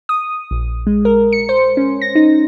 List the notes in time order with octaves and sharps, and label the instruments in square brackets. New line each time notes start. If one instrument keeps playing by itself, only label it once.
[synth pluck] D#6
A#1
G#3
A#4
C#7
C5
C#4
A#6
D#4